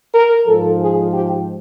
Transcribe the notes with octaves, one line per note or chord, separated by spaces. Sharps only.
A#4
G#2 F3 A4
G#4
G4